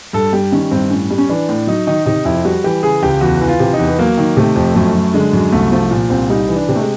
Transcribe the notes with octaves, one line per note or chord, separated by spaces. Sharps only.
G2 A4
G3 G4
D#3 C#4
G2 C4
A2 C#4
G3
C#4
E3 D4
A2
F#3 D#4
D#3 D#4
C3 D#4
F2 E4
G3 F#4
E3 G4
C#3 G#4
C#2 G4
E2 F#4
E3
F4
C3
D#4
E2
B3
F#3 A#3
D#3
C3 A3
F2
F#2 A3
F#3
D3 G#3
F#2
C2 A3
F3 A3
A#2
C2 C4
G3 D#4
E3
D4
C3
A3
G#3